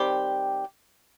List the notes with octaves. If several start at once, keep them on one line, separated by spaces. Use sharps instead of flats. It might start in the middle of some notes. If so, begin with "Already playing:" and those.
Already playing: D#3 G3 C4 G4